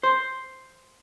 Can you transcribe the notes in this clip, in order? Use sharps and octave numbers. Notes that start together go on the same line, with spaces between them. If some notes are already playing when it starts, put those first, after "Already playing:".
C5